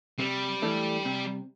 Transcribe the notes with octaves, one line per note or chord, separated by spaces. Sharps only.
C3 G3
E3 A3 D4
C3